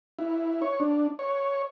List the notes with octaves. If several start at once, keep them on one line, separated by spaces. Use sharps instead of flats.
E4
C#5
D4
C#5